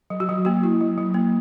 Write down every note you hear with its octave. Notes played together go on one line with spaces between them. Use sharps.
F#3
F#4
F#3
A#3 F#4
E4
F#3
F#3
A#3